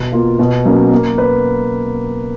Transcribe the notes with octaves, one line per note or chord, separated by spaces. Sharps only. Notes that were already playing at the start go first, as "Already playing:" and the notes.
Already playing: B2
A#3 F4
B2
F#3 A#3 C#4
A#3
B4